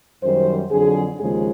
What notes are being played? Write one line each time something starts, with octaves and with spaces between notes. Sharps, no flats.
F#2 D#3 G3 C5
F2 D3 F#3 G#4
D#2 C#3 F3 G#3 G#4